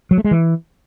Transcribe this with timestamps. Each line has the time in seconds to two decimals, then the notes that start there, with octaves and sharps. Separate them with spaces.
0.11 F#3
0.18 A3
0.24 G#3
0.31 E3